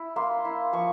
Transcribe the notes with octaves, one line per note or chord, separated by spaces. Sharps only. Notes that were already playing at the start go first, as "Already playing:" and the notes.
Already playing: E4
A#3 C6
E4
F3 C#6